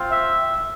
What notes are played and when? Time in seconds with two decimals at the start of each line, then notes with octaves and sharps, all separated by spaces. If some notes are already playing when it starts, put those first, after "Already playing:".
Already playing: C4 F4
0.11 E5